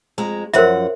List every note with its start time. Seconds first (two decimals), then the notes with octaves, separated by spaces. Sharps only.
0.18 F2 G#3 A#5
0.54 F#2 F3 A#4 C5 E5 F#5